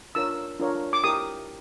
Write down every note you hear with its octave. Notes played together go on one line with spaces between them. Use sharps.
D4 F4 A#4 C#5 E6
D4 F4 A#4 C#5
D6
E4 G4 A#4 D#6